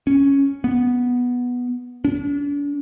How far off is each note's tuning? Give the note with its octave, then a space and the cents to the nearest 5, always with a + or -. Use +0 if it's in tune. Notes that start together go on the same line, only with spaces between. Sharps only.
C#4 +0
B3 -5
D4 -40